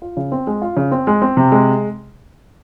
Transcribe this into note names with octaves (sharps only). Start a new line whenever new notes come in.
F4
C#3
C4
G#3
F4
C#3
C4
G#3
C4
C3
G#3